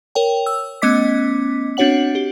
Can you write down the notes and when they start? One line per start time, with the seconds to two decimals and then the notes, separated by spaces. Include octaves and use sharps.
0.15 A#4 C#5 G5
0.46 E6
0.82 A3 B3 C#4 D#5 D6 B6
1.77 C4 D4 F#4 C#5 F#5 F#7
2.15 G4